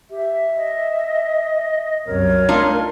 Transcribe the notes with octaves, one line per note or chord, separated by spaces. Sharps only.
G4 E5
D#5
C2 F#2 A#4 C#5
A3 D4 D#4 F4